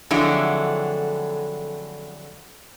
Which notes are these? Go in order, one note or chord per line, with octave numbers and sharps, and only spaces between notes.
F2 D3 F#3 G#3 A3 E4